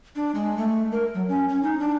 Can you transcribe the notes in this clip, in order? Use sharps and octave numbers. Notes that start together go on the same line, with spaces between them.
D4
G#3
A3
A#4
F#3
C#4
C#4
D#4
D4